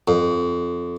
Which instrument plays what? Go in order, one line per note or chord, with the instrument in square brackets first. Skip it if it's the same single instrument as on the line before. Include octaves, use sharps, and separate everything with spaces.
[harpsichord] F2